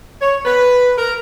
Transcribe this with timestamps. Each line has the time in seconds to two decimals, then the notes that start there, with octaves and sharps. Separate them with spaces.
0.22 C#5
0.45 B4
0.98 A#4